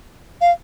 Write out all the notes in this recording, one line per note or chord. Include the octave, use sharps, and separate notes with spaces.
F5